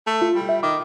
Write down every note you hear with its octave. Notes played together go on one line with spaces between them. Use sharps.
A3
F4
G3
E5
D#3 D6